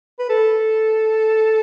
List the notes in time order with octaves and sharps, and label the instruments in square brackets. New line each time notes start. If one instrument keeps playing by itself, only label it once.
[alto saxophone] B4
A4